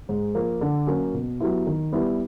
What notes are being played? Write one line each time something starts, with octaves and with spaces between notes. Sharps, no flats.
G#2
F3 A#3
D3
F#3 A#3 C#4
B2
F#3 B3 E4 G4
D#3
G3 B3 E4